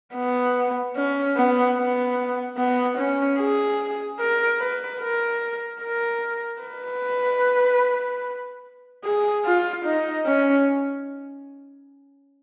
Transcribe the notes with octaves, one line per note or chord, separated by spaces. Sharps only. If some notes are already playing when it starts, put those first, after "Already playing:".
B3
C#4
B3
B3
B3
C#4
G#4
A#4
B4
A#4
A#4
B4
G#4
F4
D#4
C#4